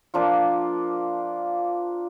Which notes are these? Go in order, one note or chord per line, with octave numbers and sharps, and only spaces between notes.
F3 A#3 D4 F4